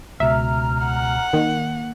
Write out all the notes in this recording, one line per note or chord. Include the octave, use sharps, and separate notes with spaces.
C#2 B2 E5 A#5 F6
F#5
D#3 A#3